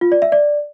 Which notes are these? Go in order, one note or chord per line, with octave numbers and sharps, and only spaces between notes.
F4
D5
E5
D5